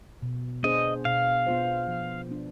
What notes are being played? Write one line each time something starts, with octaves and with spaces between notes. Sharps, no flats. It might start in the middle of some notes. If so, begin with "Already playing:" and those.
B2
B3 D4 G#4 C5 D#5
B2 F5
B3 F4 C5
F3
B3 D4